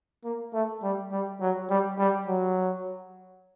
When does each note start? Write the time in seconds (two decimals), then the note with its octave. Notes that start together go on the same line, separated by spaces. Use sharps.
0.24 A#3
0.54 A3
0.83 G3
1.12 G3
1.41 F#3
1.70 G3
1.99 G3
2.28 F#3